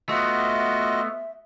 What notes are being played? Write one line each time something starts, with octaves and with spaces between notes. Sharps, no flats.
A3 B3 F4 F#4 D#5 E5